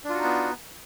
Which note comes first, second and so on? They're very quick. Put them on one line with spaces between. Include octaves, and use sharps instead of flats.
D4 F4 F#4 D#4 B3